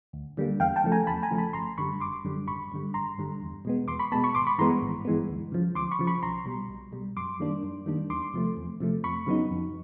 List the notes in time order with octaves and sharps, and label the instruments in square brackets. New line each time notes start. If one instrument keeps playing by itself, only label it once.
[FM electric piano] D2
D3 G3 A#3
E2 F5 G5
G5 A5
C#3 F3 A3
G#5 A#5
E2 A5 B5
G#5 A#5
C#3 F3 A3
A5 B5
G1 A#5 C6
F#2 D3 G3 B5 C#6
G1 C6 D6
F#2 D3 G3
G#1 B5 C#6
G2 D3 G3
G#1 A#5 C6
G2 D3 G3
E2
B2 G#3 B3
E2 C6 D6
B5 C#6
B2 G#3 B3 A5 B5
B5 C#6
G#1 C6 D6
B5 C#6
G2 E3 G#3 B3 A#5 C6
G#1
G2 E3 G#3 B3
D2
C#3 F3
D2 C6 D6
B5 C#6
C#3 F3
B5 C#6
B1 A#5 C6
B2 G3
B1
B2 G3
F#2 C6 D6
D#3 G3 A#3 D4
F#2
D#3 G3 A#3 D4
E2 C6 D6
C3 F3 A3
E2
C3 F3 A3
F2 B5 C#6
C#3 F#3 B3 D#4
F2